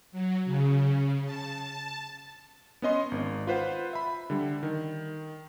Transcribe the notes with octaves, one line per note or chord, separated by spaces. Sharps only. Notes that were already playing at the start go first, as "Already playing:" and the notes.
F#3
C#3
A5
B3 C#4 D#5 C6
G#1
F4 B4 C5 F#5
E5 B5
D3 G3
D#3